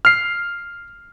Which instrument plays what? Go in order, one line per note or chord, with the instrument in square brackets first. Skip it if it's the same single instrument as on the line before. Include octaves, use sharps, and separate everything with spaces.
[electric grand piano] F6 C7